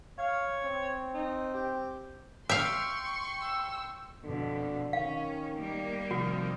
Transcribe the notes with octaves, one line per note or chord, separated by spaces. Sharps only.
C#5 F5
C4
D#4
G4
E5 F5 G5 C6 C#6
E6
F2 B2 D3
D#3 C#4 F5
G3 A#3
C3 D#3 F3 F#4